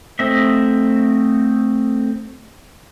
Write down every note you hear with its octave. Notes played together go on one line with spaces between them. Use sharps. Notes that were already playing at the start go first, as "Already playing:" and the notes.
A3 C4 D#5 E5